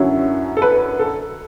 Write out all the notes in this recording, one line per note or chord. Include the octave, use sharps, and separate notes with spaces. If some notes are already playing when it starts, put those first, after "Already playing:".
Already playing: F#2 D3 F#3 C#4 E4
A4
B4
A4